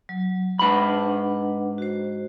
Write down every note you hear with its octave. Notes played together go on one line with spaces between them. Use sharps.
F#3
G#2 D4 B4 F#5 B5
F#4 C5